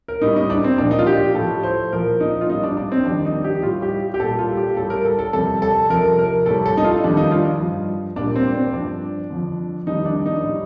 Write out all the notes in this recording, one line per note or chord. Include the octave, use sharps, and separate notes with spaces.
A#4
A2 G3 D#4
D#4
D4
C4
A#2 F3 D4
D#4
F4
G4
A2 F3 A4
C5
A#2 F3 A#4
D#4
F4
A2 G3 D#4
D4
D4
C4
F2 D#3 G3 D4
D#4
G4
A2 G3 F4
G4
G4
A#2 G3 A4
F4
G4
A2 G3 A4
A#4
A4
A4
F2 C3 G3 A4
A4
F2 C3 F3 A#4
A#4
A2 G3 A4
A4
D#4
F4
F2 D#3 G3 D4
D#4
F4
G2 F3
A#2 G3 D4
C4
C4
G2 F3 D4
F2 D3 F3
F2 D#3 G3 D#4
D4
D#4
A2
G3